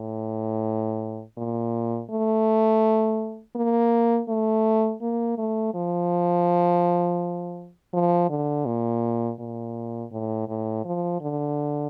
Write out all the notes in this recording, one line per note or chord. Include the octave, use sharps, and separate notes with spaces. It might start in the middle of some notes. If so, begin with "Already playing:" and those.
Already playing: A2
A#2
A3
A#3
A3
A#3
A3
F3
F3
D3
A#2
A#2
A2
A2
F3
D3